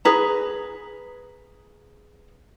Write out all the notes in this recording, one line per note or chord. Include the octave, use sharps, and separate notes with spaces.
G#4 B4 A#5